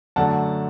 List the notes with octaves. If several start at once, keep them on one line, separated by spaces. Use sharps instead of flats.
F#2 D3 A3 F#5 A5